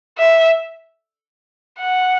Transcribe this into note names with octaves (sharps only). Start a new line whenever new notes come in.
E5
F#5